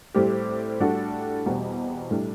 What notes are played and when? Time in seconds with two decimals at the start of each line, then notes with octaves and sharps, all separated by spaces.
0.15 A2 G3 C4 G4
0.80 A2 G3 D4 F#4 A4
1.45 E2 B2 G3 C4 F#4
2.11 A2 G3 D4